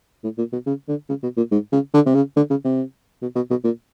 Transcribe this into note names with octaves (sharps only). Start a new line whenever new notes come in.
A2
A#2
B2
C#3
D3
C#3
B2
A#2
G#2
C#3
D3
C3
C#3
D3
C#3
C3
B2
B2
B2
A#2